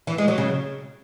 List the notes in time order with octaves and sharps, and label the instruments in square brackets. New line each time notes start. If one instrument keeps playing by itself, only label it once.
[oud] E3
G#3
F#3
C#3